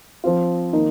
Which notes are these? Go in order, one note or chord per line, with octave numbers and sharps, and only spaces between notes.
F3 C4 F4
D#3 A#3 D#4